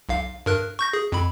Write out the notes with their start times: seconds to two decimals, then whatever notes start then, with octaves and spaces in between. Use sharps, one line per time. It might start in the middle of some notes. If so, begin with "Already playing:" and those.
0.09 B1 F5
0.46 G2 A#4 F#6
0.79 C#6 G6 A#6
0.93 G#4
1.12 F2 B5